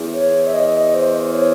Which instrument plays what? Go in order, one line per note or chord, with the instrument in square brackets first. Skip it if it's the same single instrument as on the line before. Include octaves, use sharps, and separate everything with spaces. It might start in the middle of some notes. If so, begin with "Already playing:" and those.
Already playing: [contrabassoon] E2
[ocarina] C#5
E5
D#5
C5
C#5